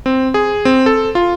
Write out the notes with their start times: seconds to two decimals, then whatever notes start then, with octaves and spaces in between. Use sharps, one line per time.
0.06 C4
0.34 G#4
0.65 C4
0.86 A4
1.15 F4